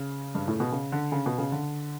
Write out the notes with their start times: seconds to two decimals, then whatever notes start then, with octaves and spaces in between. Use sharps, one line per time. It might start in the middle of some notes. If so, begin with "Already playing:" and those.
Already playing: C#3
0.35 G2
0.48 A2
0.60 B2
0.72 C#3
0.92 D3
1.12 C#3
1.26 B2
1.38 C#3
1.52 D3